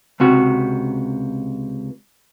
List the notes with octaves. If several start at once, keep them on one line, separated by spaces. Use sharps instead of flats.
C#2 C3 F#4